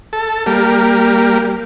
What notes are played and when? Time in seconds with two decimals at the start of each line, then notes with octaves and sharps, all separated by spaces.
0.13 A4
0.46 G3 A#3